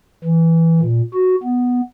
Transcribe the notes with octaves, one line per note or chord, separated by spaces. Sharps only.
E3
A#2
F#4
B3